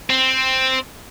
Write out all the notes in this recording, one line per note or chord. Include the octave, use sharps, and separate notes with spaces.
C4